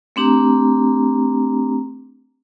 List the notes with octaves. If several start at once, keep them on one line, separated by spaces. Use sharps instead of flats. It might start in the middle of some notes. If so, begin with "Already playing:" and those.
A3 C4 D4 G4 A#5